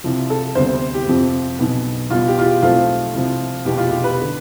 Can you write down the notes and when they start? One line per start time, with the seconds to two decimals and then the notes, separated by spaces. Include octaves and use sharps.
0.04 C2 C3 F3
0.30 A4
0.55 D2 C3 G3 B3 C5
0.94 G4
1.08 F2 C3 F3 C4
1.59 B1 B2 B3
2.10 E2 B2 G3 B3 F4
2.28 G4
2.39 F4
2.45 G4
2.62 B1 A2 F3 A3 C4 F4
3.14 C2 C3 F3
3.65 F1 E2 B2 B3 G4
3.78 F4
3.91 G4
4.04 B4
4.22 D3